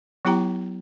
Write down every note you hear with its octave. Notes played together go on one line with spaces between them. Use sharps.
F#3 B3 E4 G4 G5 A#5